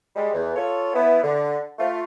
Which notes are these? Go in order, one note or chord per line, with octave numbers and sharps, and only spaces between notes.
G3 G#3
E2
F4 A4 C#5
B3 E4
D3
A3 F4